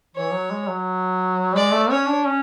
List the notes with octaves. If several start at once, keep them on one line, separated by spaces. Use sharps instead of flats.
E3 C#5
F#3
G#3
F#3
G#3 D5
A3
C#4 C#5
D4
C#4